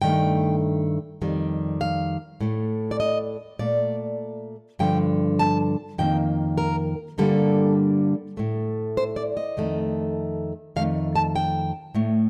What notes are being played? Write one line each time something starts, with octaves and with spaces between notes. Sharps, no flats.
G2 D#3 A3 G5
F2 D#3 G3
F5
A2 A3
D5
D#5
A#2 A3 D5
G2 D3 F3 G5
A5
F2 D#3 A#3 G5
A#4
G2 D3 G3 A#3 A4
A2 A3
C5
D5
D#5
F2 D#3 A3
F2 D#3 A3 F5
A5
G5
A2 A3